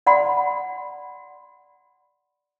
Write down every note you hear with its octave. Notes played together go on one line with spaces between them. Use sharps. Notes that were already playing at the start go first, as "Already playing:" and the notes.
D5 F#5 B5 C6